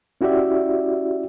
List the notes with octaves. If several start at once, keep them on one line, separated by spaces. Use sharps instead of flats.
C#4 E4 F#4 G4 D5 E5